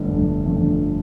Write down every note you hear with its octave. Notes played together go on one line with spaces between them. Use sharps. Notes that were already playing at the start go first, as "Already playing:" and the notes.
Already playing: G1 F2 D3 A3 D4
G1
F2 D3 A3 D4